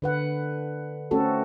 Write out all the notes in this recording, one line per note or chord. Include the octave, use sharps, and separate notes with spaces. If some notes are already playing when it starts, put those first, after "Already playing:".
D3 B4 F#5
A3 C4 C#4 F#4 A4